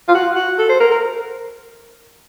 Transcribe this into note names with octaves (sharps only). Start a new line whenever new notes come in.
F4
F#4
F#4
A4
C5
A#4
A#4